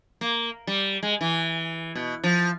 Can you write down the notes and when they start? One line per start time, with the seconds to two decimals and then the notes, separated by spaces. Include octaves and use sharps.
0.21 A#3
0.67 G3
1.03 G#3
1.21 E3
1.95 B2
2.24 F3